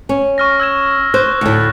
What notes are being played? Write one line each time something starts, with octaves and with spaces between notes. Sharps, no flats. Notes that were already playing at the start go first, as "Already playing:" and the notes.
C#4
C#6 F6 A#6
E6 G#6 E7
C5 F#6 G6
D2 A2